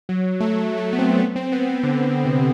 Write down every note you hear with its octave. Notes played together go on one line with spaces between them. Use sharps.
F#3
A3
A3
B3
C4
B3
C4
B3
B3
D3
D3
C3